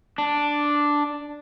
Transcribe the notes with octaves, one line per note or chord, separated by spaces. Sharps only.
D4